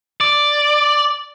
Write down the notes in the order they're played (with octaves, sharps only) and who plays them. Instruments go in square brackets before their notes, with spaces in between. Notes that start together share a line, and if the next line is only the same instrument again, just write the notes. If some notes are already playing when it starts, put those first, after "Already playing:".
[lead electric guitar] D5